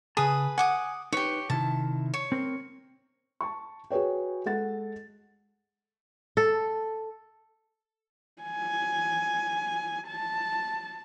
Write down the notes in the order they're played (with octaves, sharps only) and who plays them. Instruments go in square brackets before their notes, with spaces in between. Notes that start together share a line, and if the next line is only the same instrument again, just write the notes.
[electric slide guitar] C#3 A5 [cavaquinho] G#4 B4 D#6
[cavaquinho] F#5 D6 D#6 [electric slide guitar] G#5
[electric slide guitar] D#4 B4 [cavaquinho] G4 C#5
[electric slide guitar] C3 D#3 E4 [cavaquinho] A5
[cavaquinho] C#5
[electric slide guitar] C4 A#4 C5
[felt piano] A5 C#6
F#4 G#4 B4 C#5 G5
G#3 A4 F#5 A6
[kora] A4
[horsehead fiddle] G#5
A5